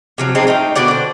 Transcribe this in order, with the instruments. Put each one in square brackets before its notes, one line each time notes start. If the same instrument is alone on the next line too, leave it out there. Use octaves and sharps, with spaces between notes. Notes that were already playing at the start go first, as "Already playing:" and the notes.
[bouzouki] C3 F3 F#3
G#3 C4 D4 D#4
A3 D#4 F5 G5
B2 D3 D5 F#5
D4 C5